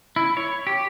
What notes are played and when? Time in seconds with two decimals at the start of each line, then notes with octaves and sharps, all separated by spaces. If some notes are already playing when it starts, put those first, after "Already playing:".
0.16 E4
0.37 C#5
0.67 G4